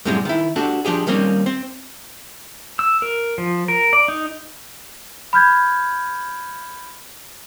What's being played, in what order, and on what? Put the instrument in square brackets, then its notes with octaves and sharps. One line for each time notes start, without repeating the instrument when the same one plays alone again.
[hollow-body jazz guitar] F#2 A2 C3 G3 G#3
D#3 E4
D4 F#4 G4 A4
F3 D4 G4 G#4
D#3 G3 A#3 C4 C#4
C4
[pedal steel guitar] E6
A#4
F3
A#4
D5
D#4
[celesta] B5 F6 G6 G#6